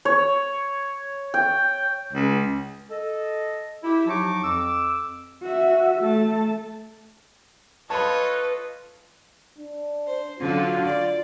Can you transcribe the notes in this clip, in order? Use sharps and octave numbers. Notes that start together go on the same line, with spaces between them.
C#5
G5
C#2
A4 D#5
E4 G4
F3 F#3 D#4 A5 C#6 D6
F2 D6 E6
F#4 E5
A3 A5
F4 A4 B4 C#5 D#5 A5 B5
D4
C5
D3 F#3 F4
D5